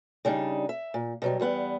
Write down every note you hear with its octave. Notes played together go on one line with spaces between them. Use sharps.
C#3 G3 D4 D#4
E5
A#2
B2 F#3 G3
E2 G3 B3 F#5